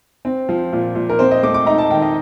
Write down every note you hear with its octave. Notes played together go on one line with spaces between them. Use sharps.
C4
F3
A#2
A#2
A#4
C4 C5
D#5
A3 D6
D6
D#4 A#5
A5
D#3 G5
D#5